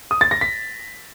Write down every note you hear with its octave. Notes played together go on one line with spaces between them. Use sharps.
D#6
A6
A#6
B6